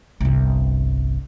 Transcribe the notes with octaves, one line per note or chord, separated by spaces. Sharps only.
G1 C2